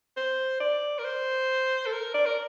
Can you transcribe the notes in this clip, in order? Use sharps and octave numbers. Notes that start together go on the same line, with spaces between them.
C5
D5
A#4
C5
A4
A#4
D5
A#4